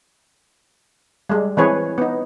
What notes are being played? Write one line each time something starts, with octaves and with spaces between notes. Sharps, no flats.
G3 G#3
E3 G#3 C4 G#4 B4 C#5
B3 D#4